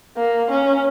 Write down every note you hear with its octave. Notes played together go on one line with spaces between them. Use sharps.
A#3
C#4